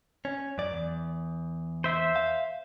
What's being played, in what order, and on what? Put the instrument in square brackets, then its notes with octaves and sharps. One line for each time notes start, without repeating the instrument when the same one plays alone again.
[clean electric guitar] C#4
F#2 D5
E2
[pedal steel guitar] C5 E5
[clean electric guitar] F5